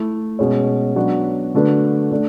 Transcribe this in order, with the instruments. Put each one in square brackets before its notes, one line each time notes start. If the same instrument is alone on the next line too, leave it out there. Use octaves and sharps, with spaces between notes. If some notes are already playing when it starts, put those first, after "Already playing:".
Already playing: [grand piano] A3 E4 A4
B2 G#3 C#4
F#3 B3 D4 F#4
D3 A3 D4 F#4 B4
A3 D4